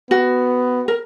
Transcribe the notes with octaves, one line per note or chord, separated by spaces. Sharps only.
B3 F#4
A#4